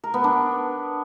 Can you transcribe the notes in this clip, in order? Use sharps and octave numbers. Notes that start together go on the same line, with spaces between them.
A#4
B3
D4